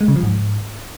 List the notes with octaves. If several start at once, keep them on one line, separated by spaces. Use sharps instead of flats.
G#3
C#3
F3
G#2